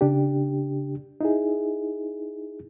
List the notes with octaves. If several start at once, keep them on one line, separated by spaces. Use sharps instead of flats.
C#3 D4 G4
D#4 E4 G#4